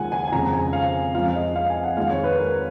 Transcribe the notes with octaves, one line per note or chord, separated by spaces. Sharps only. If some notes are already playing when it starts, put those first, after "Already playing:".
Already playing: D#2 C#3 F3 G#3 F#5 G#5
G#5
G#5
F2 C#3 G#3 A#5
G#5
F5
F2 F3 G#3 F5
F5
D#5
F5
G#5
F#5
F2 D#3 G#3 F5
C#5
B4
A#4